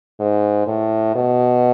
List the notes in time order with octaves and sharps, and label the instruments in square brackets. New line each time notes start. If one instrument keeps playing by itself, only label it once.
[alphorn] G#2
A2
B2